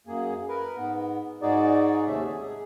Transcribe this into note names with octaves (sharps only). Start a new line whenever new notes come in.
F#2 A#3 G#4
A#4 B4
G#2 B3
G#2 D#4 F#4 G#4 D5
D#2 C3 A3 C#4 E5
G#4